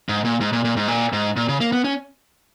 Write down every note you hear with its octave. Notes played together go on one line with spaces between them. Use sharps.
G#2
A#2
G#2
A#2
A#2
G#2
A#2
G#2
A#2
C#3
A#3
B3
C#4